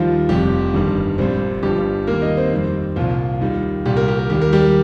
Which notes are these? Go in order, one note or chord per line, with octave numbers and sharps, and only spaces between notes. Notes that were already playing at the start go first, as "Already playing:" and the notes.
Already playing: D#2 D#3 F3 G3 F4
F1 F2 C3 G3 G4
G1 G2 D#3 G3
A#1 A#2 G3 C4 C5
G1 G2 F3 G3 G4
D#2 D#3 G3 A#3 A#4
D#4 D#5
C4 C5
F2 D#3 G3
C2 A#2 F3 F4
D#2 D#3 G3
C2 A#2 G3 G4
A#4
G4
A#4
D#2 D#3 G3 G4
A#4
G3 G4